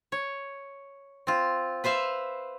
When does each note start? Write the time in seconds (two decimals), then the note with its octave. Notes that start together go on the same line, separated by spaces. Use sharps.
0.12 C#5
1.27 C4 F4
1.84 B4 C5 E5 F5